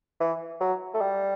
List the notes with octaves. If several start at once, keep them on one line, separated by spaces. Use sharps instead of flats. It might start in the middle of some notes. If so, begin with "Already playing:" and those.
E3
F#3
A3
G3